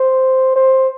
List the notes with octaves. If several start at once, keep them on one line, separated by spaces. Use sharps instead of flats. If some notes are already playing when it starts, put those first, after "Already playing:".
Already playing: C5
C5